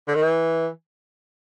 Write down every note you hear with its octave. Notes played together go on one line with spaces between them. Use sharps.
D3
D#3
E3